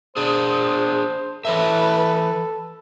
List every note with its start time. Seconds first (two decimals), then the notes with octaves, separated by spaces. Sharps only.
0.17 D4 G#4 C5
1.45 E3 A4 B4 C#5 E5